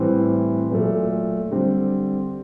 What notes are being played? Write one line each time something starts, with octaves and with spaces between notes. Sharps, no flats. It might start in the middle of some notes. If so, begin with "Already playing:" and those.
Already playing: A2 E3 G3 C4
A#2 F#3 A3
D3 G3 C4